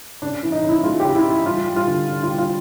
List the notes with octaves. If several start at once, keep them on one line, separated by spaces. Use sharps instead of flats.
C#3 D4
E3
D#4
C#3
E4
G#3 F4
G4
C#3
E4
E3 E4
G3 F4
G3
F4
D3
D3
F4
G3
F4